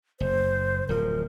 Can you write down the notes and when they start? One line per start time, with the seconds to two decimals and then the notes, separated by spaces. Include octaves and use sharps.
0.20 F#1 C5
0.89 D1 F3 A#4